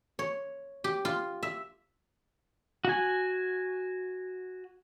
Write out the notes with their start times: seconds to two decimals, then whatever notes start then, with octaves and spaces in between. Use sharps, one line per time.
0.19 C#5
0.84 G4
1.05 F4
1.43 E5
2.85 F#4 G#5